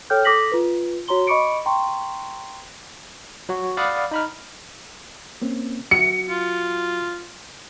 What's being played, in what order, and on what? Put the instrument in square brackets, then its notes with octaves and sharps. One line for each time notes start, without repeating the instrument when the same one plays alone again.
[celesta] A4 C#5 G5 F6 G6
A4 D6 D#6 A#6 B6 F#7
F4 B4
F#4 C#5 A#5 C6 G7
D#5 B5 C#6 D6 C#7 D7
G5 A#5 C6 C#6
[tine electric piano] F#3 F#4
D5 F5 F#5 B5 D#6
D#4 B5 F6
[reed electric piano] A#3 C4 C#4
[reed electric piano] F#3 F#4 [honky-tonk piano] C#7
[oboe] F4